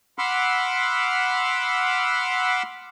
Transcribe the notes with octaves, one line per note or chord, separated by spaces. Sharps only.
F#5 B5 C6 D6 E6 F6